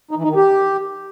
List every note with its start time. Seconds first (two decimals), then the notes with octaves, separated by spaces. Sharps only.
0.11 D#4
0.17 E3
0.23 D#4
0.30 D#3
0.36 G4